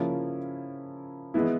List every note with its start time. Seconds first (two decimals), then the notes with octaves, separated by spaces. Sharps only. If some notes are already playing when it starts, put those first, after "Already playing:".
Already playing: C#3 F3 A#3 C#4 E4
1.34 E3 G#3 B3 E4